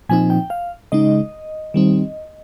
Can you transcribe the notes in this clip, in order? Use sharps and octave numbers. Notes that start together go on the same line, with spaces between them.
A#2 F3 C4 D#4 G#5
G5
F5
C#3 G#3 D#4 D#5
D#3 G3 C4 D#4